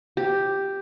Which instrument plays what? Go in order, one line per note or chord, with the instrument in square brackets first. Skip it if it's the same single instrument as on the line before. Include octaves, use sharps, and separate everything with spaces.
[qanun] G4